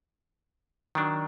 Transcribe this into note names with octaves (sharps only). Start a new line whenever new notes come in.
D#3 F#3 D4